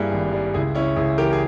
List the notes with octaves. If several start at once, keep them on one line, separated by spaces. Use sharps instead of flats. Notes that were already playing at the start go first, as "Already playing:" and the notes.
Already playing: G2 G3 A#3 E4 G#4
G#1
G3
C#2 E4 G#4
C#3 C#4 E4
C#2 E4 G#4
E3 G4 A#4
G#4